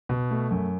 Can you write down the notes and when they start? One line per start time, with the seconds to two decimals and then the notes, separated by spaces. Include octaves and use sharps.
0.09 B2
0.31 A3
0.51 F#2